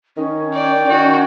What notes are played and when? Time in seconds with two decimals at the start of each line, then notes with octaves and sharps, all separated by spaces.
0.17 D#3 C#4
0.54 D5 G5
0.89 D#3 C#4 F#4